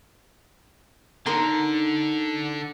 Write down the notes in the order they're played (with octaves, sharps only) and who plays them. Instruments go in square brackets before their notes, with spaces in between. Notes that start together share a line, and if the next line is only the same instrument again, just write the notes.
[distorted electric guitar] D3 [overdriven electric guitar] D#4 A5 [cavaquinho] A#4 A#5 C6